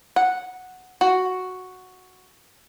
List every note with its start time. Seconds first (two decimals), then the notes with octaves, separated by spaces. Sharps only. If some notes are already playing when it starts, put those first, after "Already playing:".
0.16 F#5
1.01 F#4